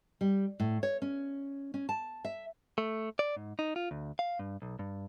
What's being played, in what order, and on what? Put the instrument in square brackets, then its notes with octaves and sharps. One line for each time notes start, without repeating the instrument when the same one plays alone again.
[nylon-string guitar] G3
A2
C#5
C#4
C#4
A5
E5
[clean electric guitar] A3
D5
G#2
D#4
F4
D2
F5
G2
B1
G2